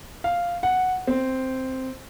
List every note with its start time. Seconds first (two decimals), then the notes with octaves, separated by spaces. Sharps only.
0.24 F5
0.63 F#5
1.07 C4